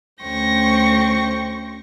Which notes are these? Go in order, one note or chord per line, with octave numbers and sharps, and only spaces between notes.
D2 C#4 C5 G5 C#6 A#6